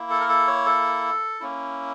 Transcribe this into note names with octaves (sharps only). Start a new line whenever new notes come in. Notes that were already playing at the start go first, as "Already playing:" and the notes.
Already playing: A#3 E4
A4
A#4
A4
C#5
A4
A#3 C#4 E4